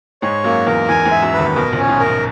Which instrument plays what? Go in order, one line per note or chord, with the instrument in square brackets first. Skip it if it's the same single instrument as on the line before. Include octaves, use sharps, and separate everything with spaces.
[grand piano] G#2 G#3 [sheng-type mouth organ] C#5
[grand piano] F#2 F#3 [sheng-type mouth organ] A#3
[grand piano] E2 E3 [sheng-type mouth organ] A#4
[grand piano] E2 E3 [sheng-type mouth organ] G#5
[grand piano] G#2 G#3
[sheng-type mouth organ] E5
[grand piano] F#2 F#3
[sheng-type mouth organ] B4
[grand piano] D#2 D#3
[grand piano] B1 B2 [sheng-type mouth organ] A#4
[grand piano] A#1 A#2
[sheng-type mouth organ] C#4
[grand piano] G#2
[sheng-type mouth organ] A#4
[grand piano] F#2